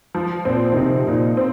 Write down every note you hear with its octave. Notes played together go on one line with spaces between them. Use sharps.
F3
A#2 C4
D#3
C3 D#4
A#2 D#4
C4